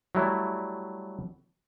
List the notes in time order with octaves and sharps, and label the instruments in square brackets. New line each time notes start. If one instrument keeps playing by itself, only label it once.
[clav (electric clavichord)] F#3 G3 A3 E4